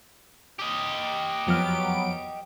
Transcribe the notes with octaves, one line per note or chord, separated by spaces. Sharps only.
G4 D#5
F2 F3 F#3 B3 F6 D7